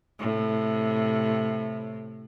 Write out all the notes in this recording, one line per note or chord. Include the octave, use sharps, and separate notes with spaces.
A2 C3